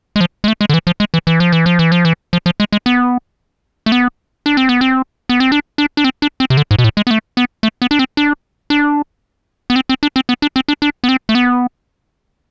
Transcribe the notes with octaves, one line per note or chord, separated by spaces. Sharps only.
G#3
F3
G#3
A3
G#3
D3
E3
F3
G#3
E3
E3
F3
E3
F3
E3
F3
E3
F3
F3
G#3
G#3
B3
A3
B3
D4
C4
B3
C4
B3
C4
D4
D4
D4
C4
D4
C4
C3
D3
G#2
B2
A2
G#3
B3
A3
B3
A3
B3
D4
C4
D4
D4
B3
C4
C4
D4
C4
B3
D4
C4
D4
D4
B3
C4
A3
B3